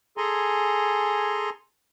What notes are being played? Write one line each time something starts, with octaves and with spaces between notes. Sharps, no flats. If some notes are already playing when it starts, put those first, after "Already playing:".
G#4 A4 G#5 A#5 C6